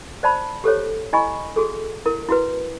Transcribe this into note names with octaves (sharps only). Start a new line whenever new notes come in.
C5 D5 A5 B5
G4 A4 C5 C#5
E4 D#5 G#5 B5 C#6
F#4 G#4 A4
E4 A#4
E4 F#4 B4